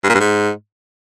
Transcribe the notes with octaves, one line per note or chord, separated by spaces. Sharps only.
G2
A#2
G2
G#2